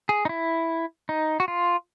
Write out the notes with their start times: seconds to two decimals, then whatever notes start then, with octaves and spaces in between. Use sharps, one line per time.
0.09 G#4
0.25 D#4
0.29 E4
1.09 D#4
1.40 F#4
1.48 F4